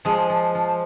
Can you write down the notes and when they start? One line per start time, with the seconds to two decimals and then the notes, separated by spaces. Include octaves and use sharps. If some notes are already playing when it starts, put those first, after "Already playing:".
0.05 F3 G#3
0.29 F3
0.55 F3